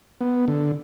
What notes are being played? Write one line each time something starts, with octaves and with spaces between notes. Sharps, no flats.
B3
D3